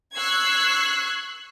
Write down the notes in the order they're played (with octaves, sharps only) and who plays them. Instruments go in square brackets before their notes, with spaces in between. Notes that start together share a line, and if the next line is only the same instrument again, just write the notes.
[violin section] C#6 E6 F#6 G#6 C7